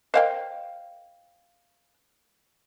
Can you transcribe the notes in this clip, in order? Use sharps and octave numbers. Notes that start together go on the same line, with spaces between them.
A#4 C5 D#5 F5 G5